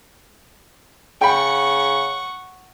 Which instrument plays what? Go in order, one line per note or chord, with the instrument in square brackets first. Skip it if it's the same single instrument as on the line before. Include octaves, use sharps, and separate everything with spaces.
[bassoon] C#3 [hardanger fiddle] F#5 C#6 [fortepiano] G5 B5